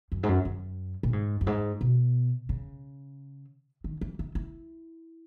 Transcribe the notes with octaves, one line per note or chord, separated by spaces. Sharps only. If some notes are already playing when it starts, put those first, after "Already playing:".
F#2
G#2
F#2
F#2
A#2
G#2
F#2
G#2
B2
C#3
D#3
E3
D#4
E4